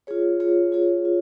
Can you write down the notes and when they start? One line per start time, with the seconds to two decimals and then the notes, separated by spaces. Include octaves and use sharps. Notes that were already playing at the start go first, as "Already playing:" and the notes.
0.07 F4 G#4 C#5
0.40 F4 G#4 C#5
0.72 F4 G#4 C#5
1.05 F4